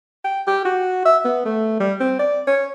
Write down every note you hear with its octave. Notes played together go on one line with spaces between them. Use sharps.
G5
G4
F#4
E5
B3
A3
G3
C4
D5
C#5